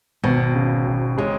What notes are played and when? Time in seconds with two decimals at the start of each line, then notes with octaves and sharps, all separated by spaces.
0.24 G#1 B2
0.55 C#3
0.87 G#1
1.18 C#3 G#3